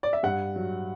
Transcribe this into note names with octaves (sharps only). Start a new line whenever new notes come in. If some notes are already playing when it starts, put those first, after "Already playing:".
D5
E5
G2 F#5
F#3